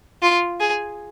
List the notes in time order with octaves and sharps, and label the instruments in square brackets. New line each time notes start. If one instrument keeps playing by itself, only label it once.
[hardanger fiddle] F4
G#4